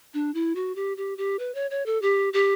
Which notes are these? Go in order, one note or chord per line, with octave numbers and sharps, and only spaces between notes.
D4
E4
F#4
G4
G4
G4
B4
C#5
C#5
A4
G4
G4